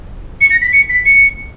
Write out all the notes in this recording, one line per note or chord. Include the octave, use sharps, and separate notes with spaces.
C#7
A#6
B6
C#7
B6
C#7